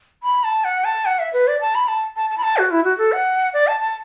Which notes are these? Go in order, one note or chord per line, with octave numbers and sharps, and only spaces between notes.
B5
A5
F#5
A5
F#5
E5
B4
D5
A5
B5
A5
A5
A5
B5
A5
F#4
E4
F#4
A4
F#5
D5
A5
A5